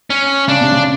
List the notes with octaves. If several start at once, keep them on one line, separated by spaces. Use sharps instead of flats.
C#4
C#3 D4
C3
C#3